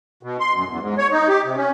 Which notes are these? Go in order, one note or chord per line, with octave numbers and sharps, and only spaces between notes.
B2
C6
F#2
E2
G#2
C#5
D#4
G4
C3
C#4